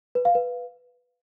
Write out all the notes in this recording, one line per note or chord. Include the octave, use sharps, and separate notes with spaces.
B4
F5
B4